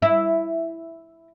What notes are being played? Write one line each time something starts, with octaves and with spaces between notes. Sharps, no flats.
E4